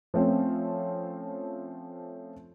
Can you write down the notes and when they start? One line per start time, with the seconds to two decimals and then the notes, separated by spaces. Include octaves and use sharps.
0.14 F3 A3 C4 C#4